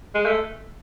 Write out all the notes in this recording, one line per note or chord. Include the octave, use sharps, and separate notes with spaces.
G#3
A3